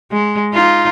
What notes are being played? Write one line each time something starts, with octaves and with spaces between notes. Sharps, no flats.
G#3
D#4 F4